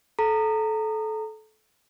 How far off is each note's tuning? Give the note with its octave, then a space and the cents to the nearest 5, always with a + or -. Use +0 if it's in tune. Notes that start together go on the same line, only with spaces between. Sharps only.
A4 -25 A#5 -25